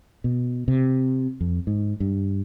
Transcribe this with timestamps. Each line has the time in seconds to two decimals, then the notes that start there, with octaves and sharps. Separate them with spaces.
0.24 B2
0.68 C3
1.41 F2
1.67 G#2
2.00 G2